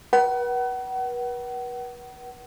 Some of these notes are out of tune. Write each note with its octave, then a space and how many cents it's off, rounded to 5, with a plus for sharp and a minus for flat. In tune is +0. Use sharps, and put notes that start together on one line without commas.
B4 -40 F#5 +35